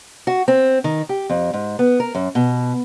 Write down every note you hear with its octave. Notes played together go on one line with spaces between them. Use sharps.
F#4
C4
D#3
G4
F2
G#2
B3
A#4
F#2
B2